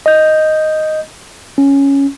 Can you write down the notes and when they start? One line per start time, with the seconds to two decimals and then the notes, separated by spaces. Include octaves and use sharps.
0.06 D#5 G6
1.58 C#4